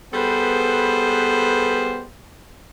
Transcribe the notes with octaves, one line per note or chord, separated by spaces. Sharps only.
G3 B3 G#4 A4 B4 C5